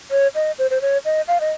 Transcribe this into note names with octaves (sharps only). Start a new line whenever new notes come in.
C#5
D#5
C5
C5
C#5
D#5
F5
D#5